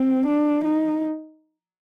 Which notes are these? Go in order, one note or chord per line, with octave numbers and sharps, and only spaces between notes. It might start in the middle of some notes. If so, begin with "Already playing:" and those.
Already playing: C4
D4
D#4